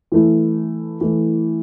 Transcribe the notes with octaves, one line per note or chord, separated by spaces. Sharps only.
E3 A3 E4
E3 A3 E4